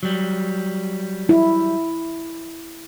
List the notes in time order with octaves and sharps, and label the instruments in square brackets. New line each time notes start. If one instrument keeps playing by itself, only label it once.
[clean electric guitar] F#3 G3
[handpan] E4